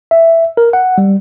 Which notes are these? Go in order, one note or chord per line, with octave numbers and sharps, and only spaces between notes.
E5
A#4
F#5
G3